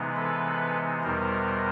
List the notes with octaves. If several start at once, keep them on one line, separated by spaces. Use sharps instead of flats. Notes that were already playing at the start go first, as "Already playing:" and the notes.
Already playing: C3 E3 G#3 B3 D#4
A4 B4
E2 B2 G3 B3 D#4 A#4 C5